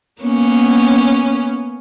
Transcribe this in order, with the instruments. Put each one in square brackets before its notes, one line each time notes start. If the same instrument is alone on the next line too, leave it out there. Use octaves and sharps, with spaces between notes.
[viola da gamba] A#3 B3 C#4